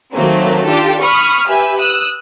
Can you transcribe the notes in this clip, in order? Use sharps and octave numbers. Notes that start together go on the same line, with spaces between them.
D#3 F#3 A3 A#3 C4
D4 F4 G4 A4
B5 C#6 D#6 F6
G4 B4 E5 G#5
D#6 E6 F#6